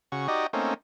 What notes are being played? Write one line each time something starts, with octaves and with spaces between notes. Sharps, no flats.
C#3 F#4 C#6
D#4 F#4 G4 D5 D#5
A3 A#3 C4 C#4 D#4